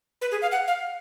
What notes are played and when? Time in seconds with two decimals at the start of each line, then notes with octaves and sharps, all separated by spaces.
0.21 B4
0.31 G#4
0.42 F5
0.51 F#5
0.67 F5